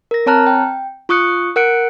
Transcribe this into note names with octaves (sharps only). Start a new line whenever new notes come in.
A#4 A#6
C4 C#5 A5 A#5 F6 F#6
G5
F4 C#6 D#6 F#6 C#7
A#4 F#5 F#6 C#7 D7